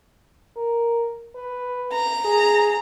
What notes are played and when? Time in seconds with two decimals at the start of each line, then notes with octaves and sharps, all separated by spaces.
0.56 A#4
1.35 B4
1.93 A#5
2.25 G#4